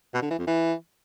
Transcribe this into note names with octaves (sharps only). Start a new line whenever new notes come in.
B2
D3
E3
F2
E3